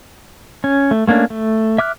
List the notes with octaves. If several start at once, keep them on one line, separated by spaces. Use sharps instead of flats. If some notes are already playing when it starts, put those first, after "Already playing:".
C#4
A3
A3 A#3 C#4 D4
A3
E5 D6 F6 F#6